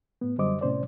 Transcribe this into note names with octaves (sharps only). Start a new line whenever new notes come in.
A2 B3
F#2 D3 G3 C5 D#5 D6
A2 C3 C#4 C5 D5